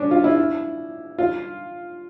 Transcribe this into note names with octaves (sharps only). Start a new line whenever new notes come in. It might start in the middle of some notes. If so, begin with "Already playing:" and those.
Already playing: C#4 D4
F4
E4
F4